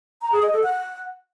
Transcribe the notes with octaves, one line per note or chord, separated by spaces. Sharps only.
A#5
G#4
D#5
A4
F#5